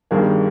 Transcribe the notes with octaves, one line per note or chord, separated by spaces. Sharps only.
G1 G2 D#3 G3 G#4